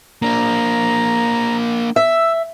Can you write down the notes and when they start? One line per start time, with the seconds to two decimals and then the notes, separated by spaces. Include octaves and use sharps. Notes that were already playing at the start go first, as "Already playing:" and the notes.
0.22 A#3 D4 A#5
1.96 E5 E6